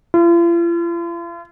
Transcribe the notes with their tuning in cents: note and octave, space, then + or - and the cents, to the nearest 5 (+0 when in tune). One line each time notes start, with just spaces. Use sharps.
F4 -45